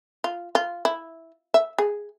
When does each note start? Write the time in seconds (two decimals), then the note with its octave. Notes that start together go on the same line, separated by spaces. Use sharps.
0.24 F4
0.55 F4
0.85 E4
1.54 E5
1.78 G#4